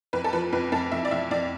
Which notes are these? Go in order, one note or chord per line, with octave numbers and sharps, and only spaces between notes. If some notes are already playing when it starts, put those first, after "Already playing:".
F2 B4
A4
F3 B4
F2 B4
F2 A4
F2 E5
D5
F2 E5
F2 D5